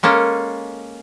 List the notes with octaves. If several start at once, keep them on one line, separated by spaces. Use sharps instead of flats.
G#3 A#3 C#4 A4